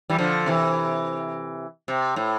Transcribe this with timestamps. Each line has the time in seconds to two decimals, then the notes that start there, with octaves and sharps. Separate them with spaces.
0.10 E3 G3
0.18 D3 F3
0.46 C3 E3
1.88 C3
2.16 A2